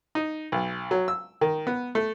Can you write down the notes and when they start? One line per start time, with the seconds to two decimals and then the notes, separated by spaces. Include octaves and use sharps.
0.15 D#4
0.52 B1
0.91 F#3
1.08 E6
1.41 D#3
1.67 B3
1.95 A3